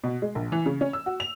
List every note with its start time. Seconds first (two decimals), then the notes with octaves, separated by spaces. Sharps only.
0.04 B2
0.22 G#3
0.35 A#1
0.52 E3
0.66 C#3
0.81 C#4
0.93 E6
1.06 F#4
1.20 F7